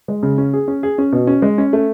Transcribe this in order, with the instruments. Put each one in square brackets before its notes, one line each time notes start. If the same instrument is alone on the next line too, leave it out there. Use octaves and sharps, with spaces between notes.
[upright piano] G#3
C#3
C#4
G#4
C#4
G#4
C#4
B2
C#4
G#3
C#4
A3